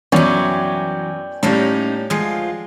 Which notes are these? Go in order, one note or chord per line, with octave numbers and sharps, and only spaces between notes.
F#2 B2 E3 F#3 C#5 D5 G5 G#5
A2 G3 A#3 C#4 D#4
D2 F3 G#3 F4